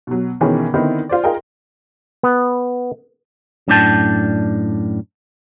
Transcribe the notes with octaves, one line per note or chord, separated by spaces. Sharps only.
B2 F#3
B2 D#3 E3 C#4 G#4
D3 D#3 B3 C4 D#4 E4
F4 C5 D5
F4 G#4 A#4 D#5 G5
B3
F#2 A2 D4 D5 G5 A5